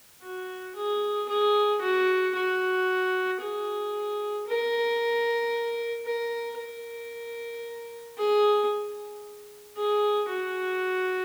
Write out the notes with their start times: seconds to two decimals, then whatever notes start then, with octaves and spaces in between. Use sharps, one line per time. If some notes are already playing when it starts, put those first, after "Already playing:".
0.23 F#4
0.76 G#4
1.29 G#4
1.82 F#4
2.35 F#4
3.41 G#4
4.48 A#4
6.06 A#4
6.58 A#4
8.18 G#4
9.77 G#4
10.29 F#4